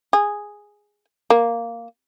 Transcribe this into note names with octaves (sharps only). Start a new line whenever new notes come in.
G#4
A#3